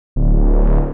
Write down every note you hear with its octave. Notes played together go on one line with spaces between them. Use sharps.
D1